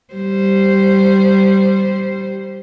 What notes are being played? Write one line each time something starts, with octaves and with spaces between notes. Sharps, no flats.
G3 C5